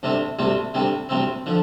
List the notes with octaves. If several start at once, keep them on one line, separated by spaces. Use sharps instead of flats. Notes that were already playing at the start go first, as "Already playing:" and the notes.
D2 C3 G3 C4
D2 C3 G3 C4
D2 C3 G3 C4
D2 C3 G3 C4
D3 F3